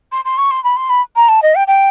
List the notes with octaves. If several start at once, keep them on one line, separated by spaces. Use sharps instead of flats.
C6
C6
C#6
C6
B5
C6
B5
A#5
A5
D#5
G5
G5